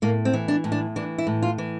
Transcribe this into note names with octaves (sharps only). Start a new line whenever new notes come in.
A2 A#3
C4
E3
D4
A2
D4
E3 D4
E4
A2
F4
E3